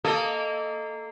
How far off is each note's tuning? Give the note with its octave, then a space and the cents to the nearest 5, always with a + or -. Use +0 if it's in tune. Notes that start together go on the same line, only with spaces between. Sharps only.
A#3 -15 A4 +0 D#5 +0